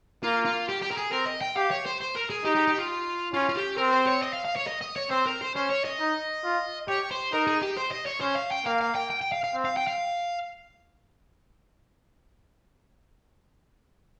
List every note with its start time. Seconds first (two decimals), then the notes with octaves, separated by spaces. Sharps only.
0.23 A#3 F4
0.45 F4
0.68 G4
0.82 G4
0.91 A#4
0.97 G#4
1.12 C4 A#4
1.27 D#5
1.41 G5
1.56 G4 F5
1.71 C#5
1.86 C5
2.01 C5
2.15 A#4
2.30 G#4
2.45 D#4 G4
2.56 G4
2.68 G4
2.78 F4
3.34 C#4 F4
3.49 F4
3.56 G4
3.78 C4 A#4
3.92 C5
4.07 C#5
4.23 D#5
4.33 F5
4.45 F5
4.56 C#5
4.67 D#5
4.81 D#5
4.96 C#5
5.10 C4 C5
5.26 A#4
5.41 C5
5.55 C#4 C5
5.70 C#5
5.85 D#5
6.00 D#4
6.44 F4
6.88 G4 C#5
7.11 C5
7.33 D#4 A#4
7.47 G#4
7.62 G4
7.77 C5
7.92 D#5
8.07 C#5
8.21 C#4 C5
8.36 F5
8.51 G5
8.66 A#3 F5
8.81 F5
8.95 G5
9.10 G5
9.21 G5
9.32 F5
9.44 F5
9.55 C4
9.65 F5
9.77 G5
9.87 F5